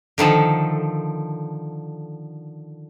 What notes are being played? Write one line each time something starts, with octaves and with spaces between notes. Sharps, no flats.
D3 D#3 F3 A4